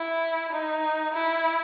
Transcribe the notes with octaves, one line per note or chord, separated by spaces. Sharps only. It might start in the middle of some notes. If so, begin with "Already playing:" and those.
Already playing: E4
D#4
E4